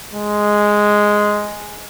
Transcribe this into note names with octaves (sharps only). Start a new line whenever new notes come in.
G#3